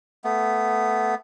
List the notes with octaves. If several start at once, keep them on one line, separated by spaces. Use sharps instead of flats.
A3 B3